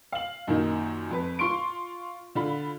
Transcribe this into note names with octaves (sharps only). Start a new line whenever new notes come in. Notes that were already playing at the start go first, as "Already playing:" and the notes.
F5 F#7
F#2 A#2 D#3 D#4
F2 B4
F4 C6 C#6 D7
D3 F4 B5